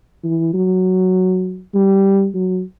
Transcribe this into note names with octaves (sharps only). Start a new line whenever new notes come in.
E3
F#3
G3
F#3